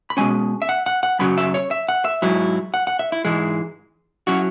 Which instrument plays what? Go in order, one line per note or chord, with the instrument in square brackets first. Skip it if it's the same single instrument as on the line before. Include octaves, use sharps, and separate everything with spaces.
[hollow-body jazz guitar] B5
B2 G#3 C#4 G#5
E5
F#5
F#5
F#5
F#2 C#3 F#3 B5
E5
C#5
E5
F#5
E5
G#2 F#3 E4
F#5
F#5
E5
E4
G#2 E3 G#3 E4
F#3 C#4 E4 F#4